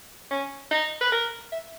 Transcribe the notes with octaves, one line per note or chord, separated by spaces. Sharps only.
C#4
D#4
B4
A#4
E5